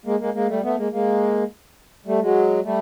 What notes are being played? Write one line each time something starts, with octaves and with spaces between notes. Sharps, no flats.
G#3 A#3
G#3 A#3
G#3 A#3
G3 A3
A3 B3
G#3 A#3
G#3 A#3
G3 A3
F#3 G#3
G3 A3